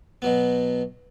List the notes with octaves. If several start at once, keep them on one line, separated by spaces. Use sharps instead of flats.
B2 F#3 B3